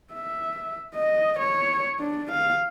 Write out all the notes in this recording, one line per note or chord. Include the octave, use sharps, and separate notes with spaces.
E5
D#5
C#5
D4
F5